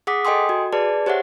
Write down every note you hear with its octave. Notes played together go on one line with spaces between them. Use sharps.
G#4 F#5 D6 D#6 B6
A4 D#5 G5 G#5 C6 D#6
F#4
G#4 B4 D5 A5
G4 C5 C#5 E5 F#5